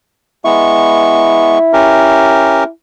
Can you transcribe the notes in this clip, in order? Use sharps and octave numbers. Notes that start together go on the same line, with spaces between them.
G#3 B3 E4 C#6
C#4 G4 A#4